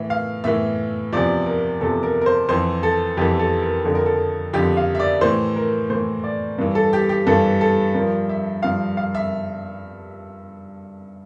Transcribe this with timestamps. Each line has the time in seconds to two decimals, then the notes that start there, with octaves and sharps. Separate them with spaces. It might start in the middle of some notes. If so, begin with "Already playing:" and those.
Already playing: A2 E3 E5
0.10 F5
0.44 A2 E3 E5
1.13 E2 C3 F3 D5
1.46 A#4
1.81 E2 C3 F3 A4
2.03 A#4
2.21 A#4
2.26 C5
2.49 F2 E3 C5
2.83 A4
3.17 F2 E3 G4
3.39 A4
3.62 A#4
3.85 F2 D3 F3 A4
3.95 A#4
4.06 A4
4.53 F2 D3 F3 G4
4.77 F5
4.95 E5
5.00 D5
5.21 A2 E3 C5
5.56 A#4
5.90 A2 E3 C5
6.24 D5
6.58 G2 E3
6.75 A4
6.93 G4
7.09 G4
7.27 G2 E3 A4
7.61 A4
7.94 G2 F3 A#4
8.29 E5
8.62 G2 F3 F5
8.97 F5
9.15 E5